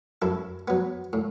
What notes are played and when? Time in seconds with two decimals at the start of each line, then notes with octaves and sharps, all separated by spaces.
0.22 F#2 E4 A4
0.68 F#3 B3
1.13 A2